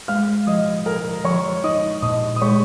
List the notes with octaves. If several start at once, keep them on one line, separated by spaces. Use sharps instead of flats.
G#3 F5 F6
F3 D#5 D#6
F3 A#4 A#5
F3 C#5 C#6
D#4 D#5 D#6
A#2 D#5 D#6
D#6
G#3 C#5 C#6